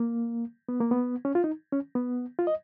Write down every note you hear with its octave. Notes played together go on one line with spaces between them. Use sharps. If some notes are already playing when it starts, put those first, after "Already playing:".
Already playing: A#3
B3
A#3
B3
C#4
F4
D#4
C#4
B3
F4
D#5